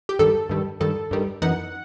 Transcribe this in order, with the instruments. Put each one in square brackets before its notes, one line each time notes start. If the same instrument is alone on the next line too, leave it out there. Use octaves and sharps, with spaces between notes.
[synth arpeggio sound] G4
G2 D#3 G3 A4
G2 D#3 G3
G2 D#3 G3 A4
G2 D#3 G3
F#2 E3 B3 D#4 F#5